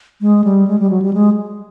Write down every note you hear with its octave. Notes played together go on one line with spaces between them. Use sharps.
G#3
G3
G#3
G3
F#3
G3
G#3